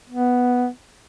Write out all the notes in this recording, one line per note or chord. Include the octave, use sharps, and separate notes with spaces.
B3